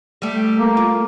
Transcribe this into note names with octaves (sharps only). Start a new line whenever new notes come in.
G3 A3
A#3
F4